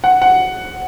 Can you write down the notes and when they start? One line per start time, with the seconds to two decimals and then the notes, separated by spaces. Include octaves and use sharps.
0.04 F#5
0.22 F#5